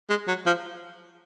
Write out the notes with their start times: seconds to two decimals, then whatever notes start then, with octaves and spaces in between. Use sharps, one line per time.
0.10 G#3
0.28 F#3
0.46 F3